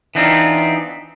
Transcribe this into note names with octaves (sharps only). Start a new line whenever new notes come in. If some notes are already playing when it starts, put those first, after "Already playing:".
E3 B3 C4 D4 D#4 F4